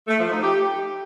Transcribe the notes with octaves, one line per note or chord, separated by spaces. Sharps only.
A3
F3
D#4
G4